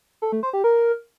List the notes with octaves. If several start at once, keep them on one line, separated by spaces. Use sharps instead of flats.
A4
A3
C5
G4
A#4